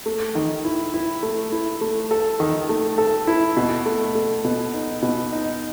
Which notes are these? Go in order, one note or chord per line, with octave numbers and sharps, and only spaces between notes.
A3
D#3
E4
E4
A3
E4
A3
A4
D#3
A3
A4
E4
B2
A3
A3
B2
D#4
B2
D#4